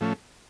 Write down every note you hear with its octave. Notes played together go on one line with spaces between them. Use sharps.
A2 F3 A3 C#4